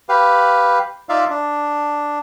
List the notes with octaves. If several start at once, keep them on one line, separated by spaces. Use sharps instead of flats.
G4 B4 F5
D#4 F4 D5 E5 F5
D4